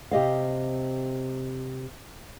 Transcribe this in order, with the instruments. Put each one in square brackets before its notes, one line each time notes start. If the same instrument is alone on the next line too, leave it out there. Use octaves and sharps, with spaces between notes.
[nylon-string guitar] C3 G4 D#5 F5